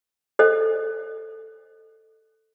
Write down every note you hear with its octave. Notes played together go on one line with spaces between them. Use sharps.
A4 C5 D#5